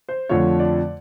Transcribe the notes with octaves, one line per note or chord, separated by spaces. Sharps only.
C5
F2 D3 F3 A3 C#5
D5